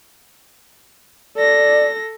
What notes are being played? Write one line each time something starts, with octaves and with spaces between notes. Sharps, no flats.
A4 D5 A#6